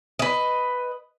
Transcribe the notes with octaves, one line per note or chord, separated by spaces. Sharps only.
B4 D#5